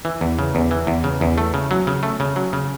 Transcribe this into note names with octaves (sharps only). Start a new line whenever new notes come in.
E3
E2
C#3
E2
E3
E2
C#3
E2
A3
C#3
F#3
C#3
A3
C#3
F#3
C#3